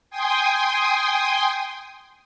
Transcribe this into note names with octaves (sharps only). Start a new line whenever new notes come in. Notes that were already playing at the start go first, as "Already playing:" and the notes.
G5 G#5 C6 D#6